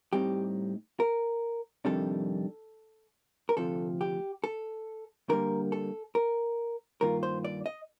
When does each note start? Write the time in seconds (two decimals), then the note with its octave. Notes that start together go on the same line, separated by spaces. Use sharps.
0.13 A2 G3 C4 D#4 G4
1.00 A#4
1.85 F2 C3 D#3 G3 D4 A4
3.49 A#4
3.57 D2 C3 F3 A4
4.01 G4
4.44 A4
5.29 D3 G3 A#3 A#4
5.72 A4
6.15 A#4
7.01 G2 D#3 A#3 F4 A#4
7.23 C5
7.45 D5
7.66 D#5